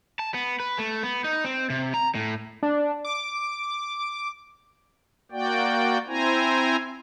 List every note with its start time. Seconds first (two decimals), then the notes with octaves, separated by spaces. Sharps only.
0.19 A5
0.34 B3
0.60 B4
0.79 A3
1.03 B3
1.24 D#4
1.45 C4
1.70 C3
1.94 A#5
2.15 A2
2.63 D4
3.05 D6
5.32 A#3 F#4 D5 G5
6.07 C4 E4 C5 G#5 A#5